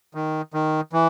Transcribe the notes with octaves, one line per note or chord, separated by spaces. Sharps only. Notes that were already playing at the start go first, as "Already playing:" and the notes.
D#3
D#3
E3